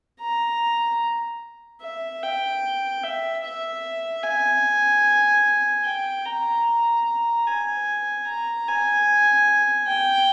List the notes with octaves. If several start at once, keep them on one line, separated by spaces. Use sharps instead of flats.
A#5
E5
G5
E5
E5
G#5
G5
A#5
A#5
G#5
A#5
G#5
G5